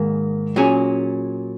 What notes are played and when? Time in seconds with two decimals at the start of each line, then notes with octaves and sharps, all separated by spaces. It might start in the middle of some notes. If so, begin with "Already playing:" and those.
Already playing: G#2 D#3 A#3
0.56 A#2 F#3 C#4 G#4